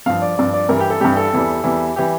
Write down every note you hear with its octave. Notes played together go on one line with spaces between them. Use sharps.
G2 F3 F5
D5
G2 F3 D5
D5
G2 E3 G3 A#4
G4
A4
G2 E3 G3 G4
A4
E2 E3 G3
E2 E3 G3
E3 G3 G4